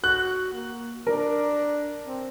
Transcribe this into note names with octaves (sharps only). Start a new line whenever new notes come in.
F#4 F#6
A#3
D4 A#4
C4